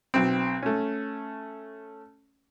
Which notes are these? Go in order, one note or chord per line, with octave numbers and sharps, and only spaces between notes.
B1 C4
A3 C#4